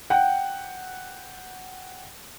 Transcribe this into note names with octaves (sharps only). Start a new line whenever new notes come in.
F#5 G5